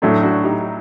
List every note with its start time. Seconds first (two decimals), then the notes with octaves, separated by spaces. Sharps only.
0.02 A2 F#3 A3 D4 F#4
0.23 D4 F#4
0.44 D#4 G4